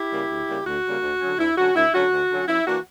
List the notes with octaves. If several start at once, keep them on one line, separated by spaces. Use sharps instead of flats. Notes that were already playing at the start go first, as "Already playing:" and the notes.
Already playing: E4 G4
C#3 G3 A#3
D2
C#3 G3 A#3
D2 F#4
C#3 G3 A#3
D2
D3 F#3 C#4
D2 E4
D3 F#3 C#4 F#4
D2 E4
D3 F#3 C#4 F#4
D2
D3 F#3 C#4
F#2 E4
E3 A#3 D4 F#4